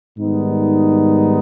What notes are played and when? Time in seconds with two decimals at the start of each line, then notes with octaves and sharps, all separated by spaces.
0.17 G#2 D#3 G3 B3 D#4